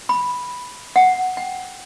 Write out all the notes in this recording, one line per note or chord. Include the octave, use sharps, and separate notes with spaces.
B5
F#5
G5